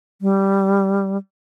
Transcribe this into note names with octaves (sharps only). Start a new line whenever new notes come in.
G3